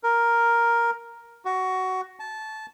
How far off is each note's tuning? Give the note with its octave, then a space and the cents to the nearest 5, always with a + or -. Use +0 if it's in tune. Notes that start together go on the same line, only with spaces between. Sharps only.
A#4 +5
F#4 +15
A5 -15